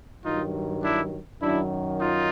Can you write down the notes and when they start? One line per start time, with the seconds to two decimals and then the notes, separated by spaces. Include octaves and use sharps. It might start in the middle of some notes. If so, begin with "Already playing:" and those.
0.24 G2 D#3 F#3 D#4 F4
0.83 D4 E4
1.41 F#2 D#3 F#3 D4 E4
2.00 D#4 F4